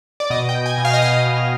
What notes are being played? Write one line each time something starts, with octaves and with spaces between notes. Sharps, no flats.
D5
B2 D#5
G5
B2
G#5
B2
F5
D#5
B2 F5
B2